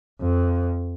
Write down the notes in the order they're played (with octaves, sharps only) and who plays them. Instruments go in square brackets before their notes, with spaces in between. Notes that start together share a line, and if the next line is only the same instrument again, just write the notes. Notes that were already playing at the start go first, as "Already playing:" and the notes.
[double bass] F2